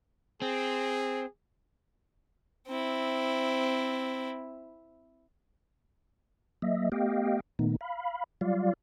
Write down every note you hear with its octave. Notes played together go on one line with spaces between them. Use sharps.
C4 G#4
C4 E4
F#3 A#3 D#5 E5
A3 B3 G4 D#5 F5 G5
A#2 D#3 A3 B3 D#4
F5 B5
F#3 G3 F4 D5 F5